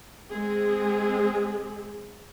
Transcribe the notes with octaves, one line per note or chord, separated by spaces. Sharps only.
G#3 C4 G#4